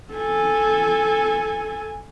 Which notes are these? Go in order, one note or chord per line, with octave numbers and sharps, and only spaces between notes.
A4 G#5